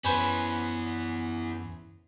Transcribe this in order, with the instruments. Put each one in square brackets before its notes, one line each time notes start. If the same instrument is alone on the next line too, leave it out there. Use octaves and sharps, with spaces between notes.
[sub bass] F#2 [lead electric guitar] E3 B3 [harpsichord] C#4 B4 C5